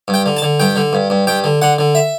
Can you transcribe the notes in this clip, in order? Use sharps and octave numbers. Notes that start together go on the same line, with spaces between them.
G2
G5
D3
A5
D3
G2 G5
D3
G2
G2
G2 G5
D3
D3 F#5
D3
E5